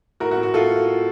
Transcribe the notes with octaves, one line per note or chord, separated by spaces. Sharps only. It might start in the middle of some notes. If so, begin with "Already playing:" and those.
A2 F#4 A#4
F#4
A2
F#4
A2 F4 A4